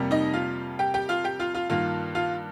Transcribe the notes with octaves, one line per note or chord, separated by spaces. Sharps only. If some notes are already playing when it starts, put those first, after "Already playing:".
Already playing: F2 C3 G3 A#3
D#4 D#5
F4 F5
G4 G5
G4 G5
F4 F5
G4 G5
F4 F5
F4 F5
G2 D#3 A#3 F4 F5
F4 F5